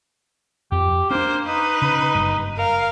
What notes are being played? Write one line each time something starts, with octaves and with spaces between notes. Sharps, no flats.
F2 G4
A#3 C#4 D4 C5
D#4 B4
C#3
F#1 G2
A#4 F5